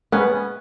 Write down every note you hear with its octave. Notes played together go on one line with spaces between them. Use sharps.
B3 C#4